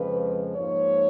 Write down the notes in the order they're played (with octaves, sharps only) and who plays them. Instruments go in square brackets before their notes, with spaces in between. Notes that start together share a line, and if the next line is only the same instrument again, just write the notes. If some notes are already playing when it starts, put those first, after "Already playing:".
Already playing: [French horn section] F2 C#3 F3 G#3 B4
G#2 F3 A#3 C#5